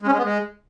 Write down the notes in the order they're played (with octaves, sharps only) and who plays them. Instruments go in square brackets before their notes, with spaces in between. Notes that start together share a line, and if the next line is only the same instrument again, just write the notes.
[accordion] G#3
C#4
G#3
B3
G#3